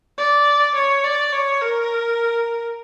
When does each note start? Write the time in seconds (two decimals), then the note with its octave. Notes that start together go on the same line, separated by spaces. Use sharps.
0.18 D5
0.75 C#5
1.04 D5
1.32 C#5
1.61 A#4